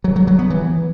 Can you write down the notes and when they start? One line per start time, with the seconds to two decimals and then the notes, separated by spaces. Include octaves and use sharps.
0.04 F#3
0.16 F#3
0.27 F#3
0.39 B3
0.50 E3